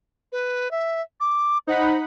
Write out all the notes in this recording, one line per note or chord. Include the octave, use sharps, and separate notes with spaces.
B4
E5
D6
D#4 C5 F#5 B5